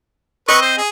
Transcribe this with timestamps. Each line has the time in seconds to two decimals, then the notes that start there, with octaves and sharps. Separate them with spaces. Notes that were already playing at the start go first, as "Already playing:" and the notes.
0.49 C4 B4 D#5 C#6
0.62 C5
0.77 G#4